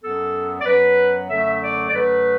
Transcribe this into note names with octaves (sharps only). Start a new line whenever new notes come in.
F#2 F#3 B3 A4
D5
F#2 F#3 B3 B4
F#2 D3 F#3 A3 E5
D5
D5
F#2 D3 F#3 A3 B4